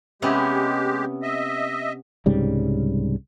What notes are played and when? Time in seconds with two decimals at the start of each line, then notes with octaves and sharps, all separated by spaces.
0.22 C3 G#3 B3 C#4 G4
1.23 D#5 E5
2.26 C2 G#2 C#3 G3